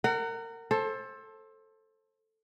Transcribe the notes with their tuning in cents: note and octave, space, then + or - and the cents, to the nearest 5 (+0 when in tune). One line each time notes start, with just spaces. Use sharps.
A#4 -25 F#5 +20
A4 +0 C5 +30